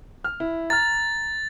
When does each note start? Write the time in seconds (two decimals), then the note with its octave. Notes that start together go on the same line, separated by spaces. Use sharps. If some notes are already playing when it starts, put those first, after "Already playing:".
0.24 F6
0.40 E4
0.70 A#5 F6 A6